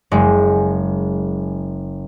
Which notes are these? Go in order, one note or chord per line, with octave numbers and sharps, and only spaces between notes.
F#1 G#3